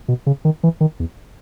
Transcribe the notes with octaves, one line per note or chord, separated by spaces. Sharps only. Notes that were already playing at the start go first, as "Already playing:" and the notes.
B2
C#3
D#3
E3
D#3
E2